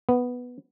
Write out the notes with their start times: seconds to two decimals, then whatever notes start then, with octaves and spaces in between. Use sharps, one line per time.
0.09 B3